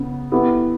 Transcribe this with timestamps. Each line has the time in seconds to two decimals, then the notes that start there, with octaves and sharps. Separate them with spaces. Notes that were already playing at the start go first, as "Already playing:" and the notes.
Already playing: C#3 B3
0.32 B3 E4 G4 B4